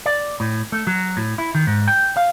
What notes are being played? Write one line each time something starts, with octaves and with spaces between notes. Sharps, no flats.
D5
A2
A3
F#3
A2
E4
D#3
G#2
G5
F5